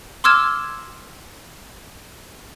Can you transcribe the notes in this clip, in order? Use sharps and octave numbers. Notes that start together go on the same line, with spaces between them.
C6 D6 E6 F6 G#6 E7